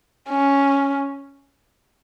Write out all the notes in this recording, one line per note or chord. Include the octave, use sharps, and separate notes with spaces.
C#4